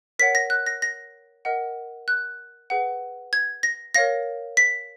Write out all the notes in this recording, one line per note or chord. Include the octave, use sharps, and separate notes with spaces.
A#4 C#5 F#5 B6
A#6
F#6
A#6
A#6
A#4 D#5 F#5
F#6
G#4 B4 F#5
G#6
A#6
A#4 C#5 F5 A#6
B6